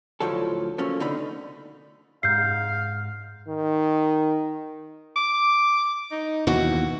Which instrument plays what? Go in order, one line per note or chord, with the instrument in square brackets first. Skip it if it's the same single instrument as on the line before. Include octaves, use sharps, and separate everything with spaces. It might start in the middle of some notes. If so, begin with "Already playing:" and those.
[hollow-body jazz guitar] D2 A2 F3 F#3 A4
F3 F#3 A3 A#3 C#4
B2 D3 D#4 B5
[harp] G#2 [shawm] F5 [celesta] G6 C7
[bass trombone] D#3
[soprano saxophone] D6
D#4
[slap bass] D#2 B2 E3 [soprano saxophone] F#4